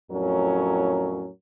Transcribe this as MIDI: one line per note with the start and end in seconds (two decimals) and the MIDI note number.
0.12 1.29 41
0.12 1.29 45
0.12 1.29 54
0.12 1.29 61
0.12 1.29 70